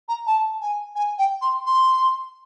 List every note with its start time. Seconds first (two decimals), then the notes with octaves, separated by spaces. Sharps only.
0.08 A#5
0.26 A5
0.61 G#5
0.96 G#5
1.18 G5
1.41 C6
1.65 C6